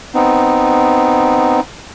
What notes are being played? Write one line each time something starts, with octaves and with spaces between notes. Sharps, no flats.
B3 C4 D#4